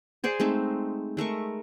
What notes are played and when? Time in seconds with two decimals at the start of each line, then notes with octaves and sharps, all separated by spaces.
0.24 G#4 C5 D5 G#5
0.40 G#3 A3 C4 D#4
1.17 G#3 A3 A#4 C#6